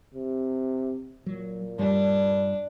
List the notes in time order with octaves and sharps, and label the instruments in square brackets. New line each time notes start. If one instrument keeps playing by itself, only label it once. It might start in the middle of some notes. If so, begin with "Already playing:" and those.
[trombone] C3
[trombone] A#2 [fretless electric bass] F#3
[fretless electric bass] G2 G3 [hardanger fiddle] D4